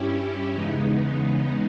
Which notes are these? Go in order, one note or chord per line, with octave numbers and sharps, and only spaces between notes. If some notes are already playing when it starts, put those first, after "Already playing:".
Already playing: G2 G3 C#4 E4 G4
E2 C#3 G#3 B3 D#4